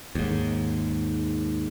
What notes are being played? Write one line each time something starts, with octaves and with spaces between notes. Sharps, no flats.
D#2 G#2